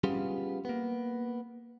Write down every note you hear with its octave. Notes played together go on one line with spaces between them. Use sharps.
G3 B3 C#4 F4 G4 G#4
A#3 B3